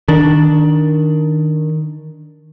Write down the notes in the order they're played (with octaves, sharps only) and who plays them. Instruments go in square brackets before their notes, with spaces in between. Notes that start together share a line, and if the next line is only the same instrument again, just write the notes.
[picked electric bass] D#3 D4